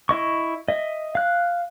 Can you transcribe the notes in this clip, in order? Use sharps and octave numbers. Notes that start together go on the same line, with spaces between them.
E4 D#5 C#6
D#5 E5
F5 F#6